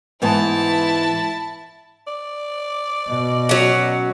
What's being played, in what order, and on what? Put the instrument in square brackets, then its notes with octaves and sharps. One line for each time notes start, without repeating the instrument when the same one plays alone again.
[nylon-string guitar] G#2 E3 B3 [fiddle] E4 A5
[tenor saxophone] D5
[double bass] B2 [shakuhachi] D#5
[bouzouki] F#3 C#4